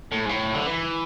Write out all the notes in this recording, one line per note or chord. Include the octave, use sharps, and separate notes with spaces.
A2
G#2
A2
D3
E3